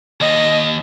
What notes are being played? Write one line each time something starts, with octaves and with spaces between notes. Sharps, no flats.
D#2 D#5